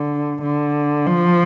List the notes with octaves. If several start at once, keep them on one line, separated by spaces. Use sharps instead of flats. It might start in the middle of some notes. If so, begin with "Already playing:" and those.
Already playing: D3
D3
F3